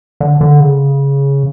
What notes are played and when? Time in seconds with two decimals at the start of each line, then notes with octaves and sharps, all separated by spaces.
0.20 D3
0.41 D3
0.60 C#3